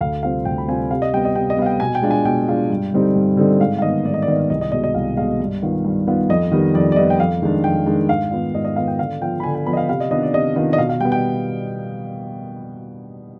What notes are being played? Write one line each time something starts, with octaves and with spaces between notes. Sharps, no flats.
D2 F5
C3 G3 C4 F4 F5
D2 G5
B5
C3 G3 C4 F4 G#5
C3 F5
D#5
G3 B3 G5
D#5
C3 G5
D#5
G3 B3 F5
G5
B2 G#5
G5
G#3 D4 F4
G#5
B2 G5
G#3 D4 F4
G2
D3 G3 C4 D#4
G2
D3 G3 C4 D#4
G#2 F5
F5
D#3 B3 D#5
G#2 D5
D#5
D5
D#3 B3 D#5
D5
C2 D#5
D#5
B2 G#3 D#5
D#5
C2 F5
B2 G#3 F5
G2
D#3 B3 F4
G2
D#3 B3 F4
F2 D#5
D#3 G3 B3
F2 D5
D5
D#3 G3 B3 D#5
G5
F2 F5
D#3 G#3 D4
F2 G5
D#3 G#3 D4
G#2 F5
D#3 B3 F4
G#2 D#5
D#5
D#3 B3 F4 F5
G5
D3 F5
F3 B3 F4 G5
B5
D3 G#5
G#5
F3 B3 F4 B5
D#5
F5
C3 F5
D#5
D#3 B3 D4 F4 D#5
D5
C3 D#5
D#3 B3 D4 F4 D#5
D#5
B2 F5
F5
G3 B3 G5
G5